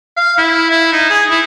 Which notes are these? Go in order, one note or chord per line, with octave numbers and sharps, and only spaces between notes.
F5
E4
E4
D#4
G#4
E4